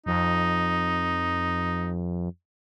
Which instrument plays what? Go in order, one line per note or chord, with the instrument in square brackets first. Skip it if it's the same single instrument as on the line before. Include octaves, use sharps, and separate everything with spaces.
[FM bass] F2 [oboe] D#4